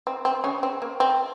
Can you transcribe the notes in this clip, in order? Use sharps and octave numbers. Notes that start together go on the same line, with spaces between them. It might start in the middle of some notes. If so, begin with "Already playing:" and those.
C4
C4
C#3 C#4
C4
A#3
C4